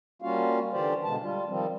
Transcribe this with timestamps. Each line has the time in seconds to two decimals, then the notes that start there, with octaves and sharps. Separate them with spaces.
0.22 G3 A#3 C#4 F4 F#4 F5
0.72 D3 E3 F4 G4 C5 D5
1.04 B2 D3 G#3 A5
1.21 G3 F4
1.48 D#3 F3 G3 C4